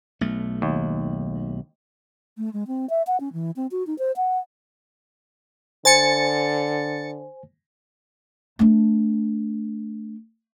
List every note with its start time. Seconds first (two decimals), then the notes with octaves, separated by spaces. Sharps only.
0.21 B1 A3
0.62 D#2
2.38 A3
2.53 G#3
2.67 C4
2.90 E5
3.07 F#5
3.20 C#4
3.33 E3
3.56 C4
3.71 F#4
3.87 D#4
3.99 C5
4.17 F#5
5.85 D3 C5 G#5 A6 C#7
8.59 A3 D4